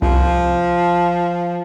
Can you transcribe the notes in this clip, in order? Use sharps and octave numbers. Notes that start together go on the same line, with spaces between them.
C2 F3